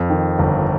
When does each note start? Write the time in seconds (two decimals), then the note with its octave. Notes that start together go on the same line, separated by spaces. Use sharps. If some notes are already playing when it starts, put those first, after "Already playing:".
Already playing: F2
0.10 D#3
0.39 G1